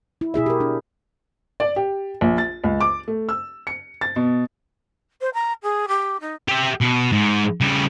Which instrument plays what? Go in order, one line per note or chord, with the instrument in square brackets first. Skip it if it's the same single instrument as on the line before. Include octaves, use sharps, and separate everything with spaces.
[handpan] E4
B2 E4 G#4 E5
G4 A#4
D4
[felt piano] D5
G4
A#1
A6
C#2
D6
A3
E6
C#7
A6
B2
[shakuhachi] C5
A#5
G#4
G4
D#4
[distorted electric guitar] G4 E5
B2
G#2
C#3 G3